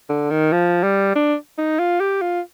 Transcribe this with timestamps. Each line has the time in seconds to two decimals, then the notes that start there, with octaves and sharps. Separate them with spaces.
0.10 D3
0.31 D#3
0.52 F3
0.84 G3
1.16 D4
1.58 D#4
1.79 F4
2.00 G4
2.22 F4